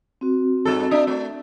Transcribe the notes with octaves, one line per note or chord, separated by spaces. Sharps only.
C4 F#4
G2 A4
D4 E5
A3